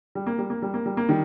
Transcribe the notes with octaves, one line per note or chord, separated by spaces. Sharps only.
G3
A#3
G3
A#3
G3
A#3
G3
A#3
D#3 G3